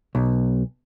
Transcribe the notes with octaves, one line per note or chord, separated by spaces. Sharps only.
B1